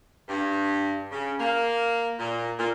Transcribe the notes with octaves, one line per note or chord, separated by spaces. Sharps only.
G2
C#3
A#3
A#2
A#2